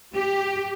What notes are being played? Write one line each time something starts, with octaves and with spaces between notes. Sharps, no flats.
G4